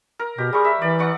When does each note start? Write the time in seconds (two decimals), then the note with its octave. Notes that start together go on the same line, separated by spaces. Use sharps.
0.19 A#4
0.38 B2 G4
0.53 G3 G#4 C#6
0.65 E5
0.82 E3 D5
0.99 D5 F#5 C#6